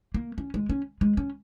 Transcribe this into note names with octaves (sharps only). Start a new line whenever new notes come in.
A#3
C#4
G#3
C#4
G#3
C#4